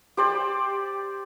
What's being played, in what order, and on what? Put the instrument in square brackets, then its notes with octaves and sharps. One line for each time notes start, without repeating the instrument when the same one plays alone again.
[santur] G4 C5 D5